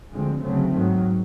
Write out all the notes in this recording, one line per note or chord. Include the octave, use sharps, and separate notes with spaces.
D2 D3 F3 G#3 C4
D2 C#3 F#3 A3 C4
G#2 D#3 F#3